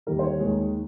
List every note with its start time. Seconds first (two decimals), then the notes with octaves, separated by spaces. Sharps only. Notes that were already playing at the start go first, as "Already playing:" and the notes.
0.07 D#2 D#3 G3 A#4
0.19 C5
0.23 C#5
0.40 D#2 D#3 G#3